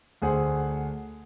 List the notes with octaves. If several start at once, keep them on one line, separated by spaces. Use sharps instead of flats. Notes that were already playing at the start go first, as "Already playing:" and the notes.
D2 G#4 C5 F#5